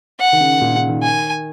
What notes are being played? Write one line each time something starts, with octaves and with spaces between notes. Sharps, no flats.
F#5
D#3
C#3
A#2
C#3
D#3
G#5